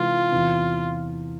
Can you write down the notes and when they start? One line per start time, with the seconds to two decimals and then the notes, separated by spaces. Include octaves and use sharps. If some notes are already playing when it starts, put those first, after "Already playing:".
Already playing: C3 E3 G#3 F4
0.32 E2 C3 E3